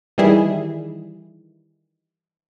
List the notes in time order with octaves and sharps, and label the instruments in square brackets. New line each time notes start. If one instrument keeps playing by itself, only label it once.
[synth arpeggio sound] D#3 E3 G3 E4 G#4